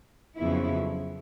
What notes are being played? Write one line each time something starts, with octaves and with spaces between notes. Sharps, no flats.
F2 C#3 F#3 B3 E4